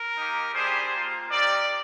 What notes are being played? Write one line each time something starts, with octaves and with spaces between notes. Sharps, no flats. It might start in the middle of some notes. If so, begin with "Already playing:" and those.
Already playing: A#4
A#3 D#4 G4
G3 D4 G4 G#4 C5
A#3 F4
C4 D#4 G4 A#4 D5